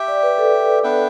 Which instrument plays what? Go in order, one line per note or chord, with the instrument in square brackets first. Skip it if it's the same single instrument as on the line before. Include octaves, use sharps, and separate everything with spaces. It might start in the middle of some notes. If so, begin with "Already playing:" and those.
Already playing: [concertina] G4 E5 G5
[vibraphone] D5
B4
A4
[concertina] B3 D4 B4 E5 G5